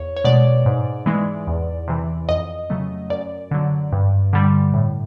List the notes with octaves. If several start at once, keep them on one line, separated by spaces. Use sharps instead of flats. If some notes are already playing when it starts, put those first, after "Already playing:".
Already playing: E2 C#5
C#5
B2 G#3 D5
G#2
E3 G#3
E2
C3 E3
F2 D#5
C#3 F#3 A3
F#2 D5
D3 F#3
G2
D3 G3
A2